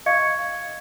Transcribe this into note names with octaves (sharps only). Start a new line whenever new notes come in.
D#5 F5 C#6 G#6 C#7